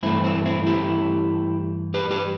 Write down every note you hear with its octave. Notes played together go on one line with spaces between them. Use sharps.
G2 E3 A3 C4 E4
C4 E4
C4 E4
E4 G4
G4 B4
G4 B4